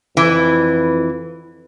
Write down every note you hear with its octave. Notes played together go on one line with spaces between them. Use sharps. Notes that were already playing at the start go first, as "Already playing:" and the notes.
F2 E3 B4